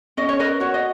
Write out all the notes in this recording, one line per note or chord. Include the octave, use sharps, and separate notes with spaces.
C#4 D#5
C#5
A#4 B4 D#5
F#4 C#5
D#5